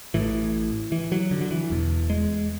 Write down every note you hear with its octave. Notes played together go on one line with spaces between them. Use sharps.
A1 A2 E3
E3
F#3
D3
F#3
E3
E1 E2 B2
G#3